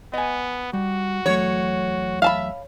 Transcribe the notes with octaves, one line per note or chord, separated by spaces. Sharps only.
B3 D#5 G#5
G3 F#4
E2 F#3 A3 C#5
E5 F5 A5 B5